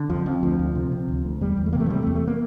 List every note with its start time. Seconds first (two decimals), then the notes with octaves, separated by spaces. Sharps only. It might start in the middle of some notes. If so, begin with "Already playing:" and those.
Already playing: D3
0.10 F2 F3
0.26 F2
0.43 D2 F3
0.59 D2
0.75 C3
0.92 C3
1.08 D2
1.25 D2
1.41 E2 G3
1.57 E2
1.66 A3
1.73 C3 A#3
1.80 A3
1.86 F3
1.90 C3 G3
2.03 A3
2.07 E2
2.15 A3
2.27 A#3